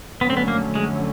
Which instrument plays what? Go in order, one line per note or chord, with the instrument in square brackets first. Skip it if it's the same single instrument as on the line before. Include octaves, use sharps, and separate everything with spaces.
[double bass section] F2 D3 F#3 A3 C#4 [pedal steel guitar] B3
[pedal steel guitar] C4
B3
A#3
G#3